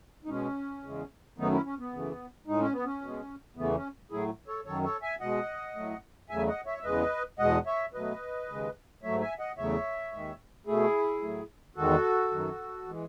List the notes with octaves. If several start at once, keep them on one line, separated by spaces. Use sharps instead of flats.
D#4
B2 G#3 C#4
E2 C#3 G#3
F#2 D#3 F#3 A3 B3 D#4
C#4 E4
C#4
B3
F#2 C#3 E3 A3
A2 G#3 D#4
C#4
B3
C#4
B2 G#3
E2 C#3 E3 A3 B3
C#4
A2 F#3 A3 E4 G#4
A4 C#5
F#2 D#3 F#3 A4 C#5
A4 C#5
E5 G#5
B2 G#3 D#5 F#5
A2 F#3 A3
E2 C#3 F#3 A3 E5 G#5
D#5 F#5
C#5 E5
E5
E2 C#3 G#3 B4 D#5
E2 B2 G#3 D#5 F#5
C#5 E5
B2 F#3 A3 B4 D#5
D#2 C#3 G#3
G#2 F#3 A3 C#5 E5
E5 G#5
D#5 F#5
E2 C#3 F#3 A3 C#5 E5
D#2 D#3 G#3
B2 A3 E4 G#4
A2 F#3 A3
E2 D#3 G#3 F#4 A4
F#2 D#3 F#3
E3 G#3